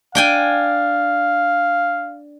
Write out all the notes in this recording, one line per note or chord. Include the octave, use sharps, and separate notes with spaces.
D4 F5 G5 G#5